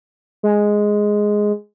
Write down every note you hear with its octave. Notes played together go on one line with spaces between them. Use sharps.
G#3